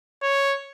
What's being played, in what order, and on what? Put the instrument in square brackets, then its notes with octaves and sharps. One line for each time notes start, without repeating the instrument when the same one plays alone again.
[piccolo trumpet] C#5